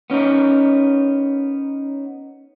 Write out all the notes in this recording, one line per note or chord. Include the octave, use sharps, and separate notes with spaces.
B3 C#4 D#4 A#4